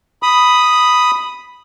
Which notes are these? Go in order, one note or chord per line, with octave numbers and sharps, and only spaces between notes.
B5 D#6